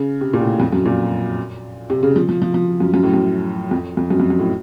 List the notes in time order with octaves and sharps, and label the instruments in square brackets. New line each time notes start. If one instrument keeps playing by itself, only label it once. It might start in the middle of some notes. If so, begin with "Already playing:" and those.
Already playing: [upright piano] C#3
C3
A#2
A2
F2
F#2
A#2
C3
C#3
F3
F3
F3
F3
F#2
F#2
A2
F#2
F2
F2
F#2
F2
F#2
A2